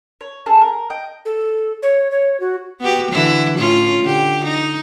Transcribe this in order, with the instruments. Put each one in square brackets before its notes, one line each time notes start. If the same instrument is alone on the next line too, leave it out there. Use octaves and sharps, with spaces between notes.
[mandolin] C#5
A3 C#4 G#4 A5
A#4
D#5 G5
[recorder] A4
C#5
C#5
F#4
[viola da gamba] B3 F#4 G4
D3 E3 E4
A2 C#4 F4
D3 G4
D#4